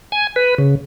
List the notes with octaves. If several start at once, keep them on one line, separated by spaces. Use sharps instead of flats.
G#5
B4
C#3